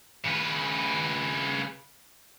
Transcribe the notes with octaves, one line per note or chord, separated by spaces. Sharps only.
C#3 B4